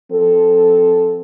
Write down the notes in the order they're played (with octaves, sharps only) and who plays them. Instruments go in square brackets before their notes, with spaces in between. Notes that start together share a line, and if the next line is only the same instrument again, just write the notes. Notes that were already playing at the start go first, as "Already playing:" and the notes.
[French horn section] F3 C4 A4